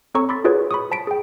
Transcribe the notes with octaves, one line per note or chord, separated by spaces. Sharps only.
C4 A4 C#5 A#5 C#6 E6
B5 C6 D6 E6 A6 B6
F4 F#4 G#4 B4 C#5
B5 C#6 D#6
C5 A5 B6 D7
G#4 G5